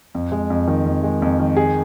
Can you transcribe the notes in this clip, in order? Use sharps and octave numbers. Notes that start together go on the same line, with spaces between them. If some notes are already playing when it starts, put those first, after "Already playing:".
F2
G#3
F2
D#3
F2
G#3
F2
D#3
G#4